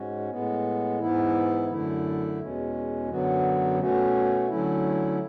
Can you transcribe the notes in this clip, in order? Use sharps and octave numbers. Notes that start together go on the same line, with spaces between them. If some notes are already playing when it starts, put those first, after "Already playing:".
Already playing: G#2 G#3 C#4 F#4
A2 G#3 B3
G#2 E3 B3 E4
F#2 D3 A3 E4
E2 B2 G#3 C#4
F#2 D3 F#3 B3 F#4
B2 A3 C#4 F#4
D3 F#3 A3 C#4 E4